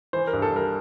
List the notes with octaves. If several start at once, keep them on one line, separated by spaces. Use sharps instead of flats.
E3 C5
A#4
G2
A4
G3 A#4